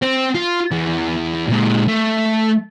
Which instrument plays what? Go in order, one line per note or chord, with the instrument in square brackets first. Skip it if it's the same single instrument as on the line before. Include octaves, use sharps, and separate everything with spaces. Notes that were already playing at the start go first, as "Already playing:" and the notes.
[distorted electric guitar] C4
F4
E2
A#2 G#3
A3